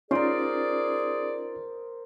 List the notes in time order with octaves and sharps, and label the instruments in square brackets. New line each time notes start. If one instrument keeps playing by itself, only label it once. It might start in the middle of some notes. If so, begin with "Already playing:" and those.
[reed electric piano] C#4 D#4 F4 [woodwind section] G#4 D5 [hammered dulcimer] A#4 C5